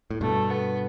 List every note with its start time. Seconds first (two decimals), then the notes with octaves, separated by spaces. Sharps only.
0.11 A2
0.21 G2 B2 A3
0.50 B3